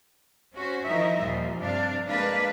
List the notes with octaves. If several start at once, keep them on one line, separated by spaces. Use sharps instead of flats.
C#4 F#4 C5
D#3 F3 D#4 E4 D#5 E5
D#2 A#2 F3 G3
G2 C3 D4 D5 F5
G#3 A#3 D4 B4 D5 F5